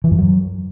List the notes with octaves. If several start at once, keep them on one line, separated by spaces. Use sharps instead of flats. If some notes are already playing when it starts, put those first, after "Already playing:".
E3
F#2
F#3